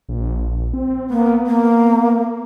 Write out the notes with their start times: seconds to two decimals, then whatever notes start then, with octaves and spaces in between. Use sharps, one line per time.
0.09 A#1
0.74 C4
1.10 A#3 B3
1.46 A#3